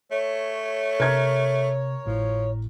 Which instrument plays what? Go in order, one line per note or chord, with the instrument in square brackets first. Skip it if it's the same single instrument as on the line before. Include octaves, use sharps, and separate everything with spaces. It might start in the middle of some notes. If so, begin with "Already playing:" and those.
[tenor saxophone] A3 [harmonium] C#5
[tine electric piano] C3 [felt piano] A#4 G#6
[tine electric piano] G#1 A2 [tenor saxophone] F3